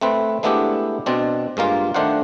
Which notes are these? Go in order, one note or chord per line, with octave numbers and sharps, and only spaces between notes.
A3 C4 B4
G#3 A3 B3 D4 E4 G4
B2 C4 D4
G2 G#3 A#3 F4
D#3 A3 D4 C5 F5 F#5